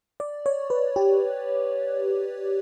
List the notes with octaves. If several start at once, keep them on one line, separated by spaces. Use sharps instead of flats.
D5
C#5
B4
G4